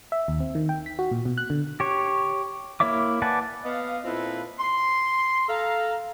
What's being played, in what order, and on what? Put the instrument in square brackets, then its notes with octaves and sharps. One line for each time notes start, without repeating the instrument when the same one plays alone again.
[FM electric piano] E5
D#2
C4
D#3
G5
B6
F#4
A#2
B2
F#6
D3
[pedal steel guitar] G4 C#5
A#3 E4 C#5 E5 D6
B4 D5 F#5 G#5 A5
[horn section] B3 D#5 F5
A#2 C4 E4 F4 A4 B4
C6
A4 F5 A#5